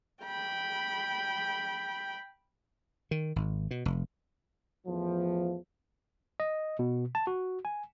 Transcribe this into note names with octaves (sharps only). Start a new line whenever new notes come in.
G5 B5
D#3
G#1
B2
F1
E2 A2 F3
D#5
B2
A5
F#4
G#5